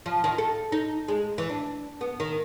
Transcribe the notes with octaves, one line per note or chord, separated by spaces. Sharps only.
F3
D#3
A4
D#4
G#3
E3
D4
B3
D#3